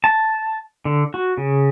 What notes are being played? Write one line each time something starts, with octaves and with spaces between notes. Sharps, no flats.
A5
D3
F#4
C#3